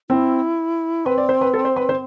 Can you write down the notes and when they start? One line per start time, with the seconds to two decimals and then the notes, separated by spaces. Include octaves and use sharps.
0.10 C4 E4
1.06 C4 B4
1.18 D5
1.29 C5
1.41 B4
1.54 A4
1.65 C5
1.76 B4
1.89 C5